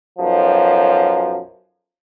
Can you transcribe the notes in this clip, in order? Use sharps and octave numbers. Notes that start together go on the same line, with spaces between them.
B1 F#2 F3